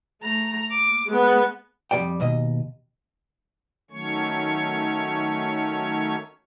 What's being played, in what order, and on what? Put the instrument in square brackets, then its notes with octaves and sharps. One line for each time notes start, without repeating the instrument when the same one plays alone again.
[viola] A3 A#5
D6
G#3 B3
[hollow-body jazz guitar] F2 G#2 G3 D5 G5
D#2 B2 D#5
[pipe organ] D#3 F#3 A3 C#4 C#5 C#6